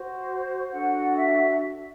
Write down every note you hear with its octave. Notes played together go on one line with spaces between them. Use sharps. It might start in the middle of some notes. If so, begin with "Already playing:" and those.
Already playing: F#4 C5
D4 F#4 A4 F#5
E5